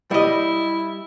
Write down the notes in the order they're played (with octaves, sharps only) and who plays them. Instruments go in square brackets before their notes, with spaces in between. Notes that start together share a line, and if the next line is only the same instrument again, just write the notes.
[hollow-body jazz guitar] G3 D#5 [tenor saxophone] E4